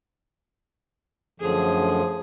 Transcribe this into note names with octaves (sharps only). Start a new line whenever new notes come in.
F#2 A2 D3 F3 G#4